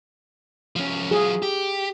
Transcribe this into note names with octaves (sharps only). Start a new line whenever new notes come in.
F3 C#4
F#3 F4 G#4
G4